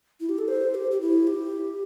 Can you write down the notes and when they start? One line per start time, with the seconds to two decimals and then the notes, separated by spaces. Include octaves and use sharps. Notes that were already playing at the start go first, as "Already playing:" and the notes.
0.20 E4
0.29 G4
0.38 A4
0.48 C5
0.74 G4
0.91 G4
1.01 E4
1.27 G4